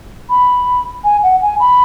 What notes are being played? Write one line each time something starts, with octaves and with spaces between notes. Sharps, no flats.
B5
G#5
F#5
G#5
B5